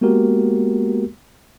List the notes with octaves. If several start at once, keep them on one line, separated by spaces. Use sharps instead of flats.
G#3 A#3 B3 F#4 G4 A#4